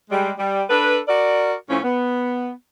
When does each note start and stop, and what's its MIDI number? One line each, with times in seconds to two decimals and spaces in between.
0.11 0.32 55
0.11 0.32 56
0.38 0.64 55
0.69 0.98 62
0.69 0.98 69
0.69 0.98 71
1.08 1.53 66
1.08 1.53 70
1.08 1.53 74
1.69 1.79 45
1.69 1.79 53
1.69 1.79 61
1.84 2.50 59